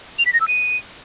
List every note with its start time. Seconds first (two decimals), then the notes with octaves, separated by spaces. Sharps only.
0.19 F7
0.26 B6
0.33 A#6
0.41 E6
0.48 D#7